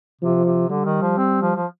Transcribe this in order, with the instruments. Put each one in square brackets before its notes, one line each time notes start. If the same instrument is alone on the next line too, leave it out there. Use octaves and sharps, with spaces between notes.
[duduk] C3 [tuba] F3
[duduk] C3
[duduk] D3 [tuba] G3
[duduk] D#3
F3
C4
F3
F3